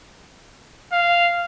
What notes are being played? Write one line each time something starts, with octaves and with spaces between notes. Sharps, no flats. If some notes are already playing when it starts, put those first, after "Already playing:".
F5